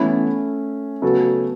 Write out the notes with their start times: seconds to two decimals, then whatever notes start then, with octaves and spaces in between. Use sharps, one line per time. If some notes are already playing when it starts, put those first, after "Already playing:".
Already playing: E3 A3 B3 C#4 E4 A4
1.02 C#3 F#3 A3 B3 F#4 A4